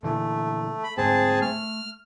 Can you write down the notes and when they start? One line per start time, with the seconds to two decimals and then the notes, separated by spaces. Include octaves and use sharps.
0.03 A#2 D3 E3 A3
0.83 B5
0.97 D2 G#2 C4 G#4 A5
1.42 A3 F6